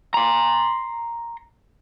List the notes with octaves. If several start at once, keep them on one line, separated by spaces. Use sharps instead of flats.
A#5 C6